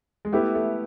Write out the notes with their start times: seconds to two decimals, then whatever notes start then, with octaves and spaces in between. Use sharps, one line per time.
0.25 G#3
0.32 A3 B3 E4 G4 B4
0.55 A3